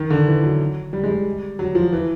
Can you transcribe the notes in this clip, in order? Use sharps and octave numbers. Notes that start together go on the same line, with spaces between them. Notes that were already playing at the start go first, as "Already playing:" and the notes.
Already playing: D#3
D3
E3
F#3
G3
G#3
G3
F#3
F3
E3